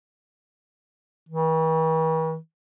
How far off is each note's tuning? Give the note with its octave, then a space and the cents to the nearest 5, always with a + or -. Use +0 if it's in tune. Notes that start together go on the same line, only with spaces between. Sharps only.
E3 -45